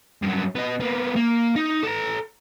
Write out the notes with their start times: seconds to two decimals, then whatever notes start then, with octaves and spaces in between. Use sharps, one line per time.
0.22 G2 F#3
0.55 B3 D#5
0.80 A#3 B3
1.16 A#3
1.56 D#4
1.83 A4 A#5